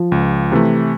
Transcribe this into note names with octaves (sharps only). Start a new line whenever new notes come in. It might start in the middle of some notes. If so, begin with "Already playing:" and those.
Already playing: F3
C#2
C3 E3 A3